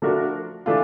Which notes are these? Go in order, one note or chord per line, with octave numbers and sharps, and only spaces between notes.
F3 A3 D4 F#4 A#4
E3 A3 D4 F4